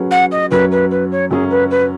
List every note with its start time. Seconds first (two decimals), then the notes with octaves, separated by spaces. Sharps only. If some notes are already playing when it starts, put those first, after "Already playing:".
Already playing: F#3 C#4 G#4 B4
0.11 F#5
0.31 D#5
0.51 F#2 F#3 C#4 B4
0.71 B4
0.90 B4
1.11 C#5
1.30 F#2 F#3 C#4 G#4
1.50 B4
1.70 B4